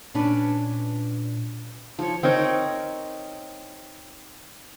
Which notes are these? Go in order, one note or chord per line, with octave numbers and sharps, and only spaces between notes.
A#2 C#4 D4 B4
F3 C#5
C4 D#4 A#4 C#5